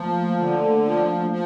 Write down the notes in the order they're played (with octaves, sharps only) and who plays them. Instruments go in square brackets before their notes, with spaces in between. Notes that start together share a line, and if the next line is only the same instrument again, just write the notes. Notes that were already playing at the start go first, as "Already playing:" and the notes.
Already playing: [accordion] F3 [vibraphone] A3 A#3
[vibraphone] A3
[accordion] D3
[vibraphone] A3
[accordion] F3
F3